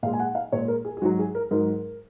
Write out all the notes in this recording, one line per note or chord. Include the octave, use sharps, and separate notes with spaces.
A#2 G#3 F5
G#5
F#5
F5
A#2 G#3 C#5
A#4
G#4
G#4
G#2 F#3 F#4
G#4
A#4
G#2 F#3 A#4